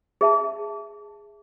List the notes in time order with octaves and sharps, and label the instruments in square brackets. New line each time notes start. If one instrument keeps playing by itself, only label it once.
[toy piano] G#4 E5 A5